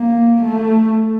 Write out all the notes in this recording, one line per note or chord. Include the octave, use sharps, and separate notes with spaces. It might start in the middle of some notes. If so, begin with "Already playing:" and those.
Already playing: A#3
A3